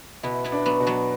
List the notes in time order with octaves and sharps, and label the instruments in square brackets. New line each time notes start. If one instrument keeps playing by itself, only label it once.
[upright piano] B2 [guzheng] B3 E4
[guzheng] B3 E4
[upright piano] D4
[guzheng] F#3 B3
[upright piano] B2
[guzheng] F#3 B3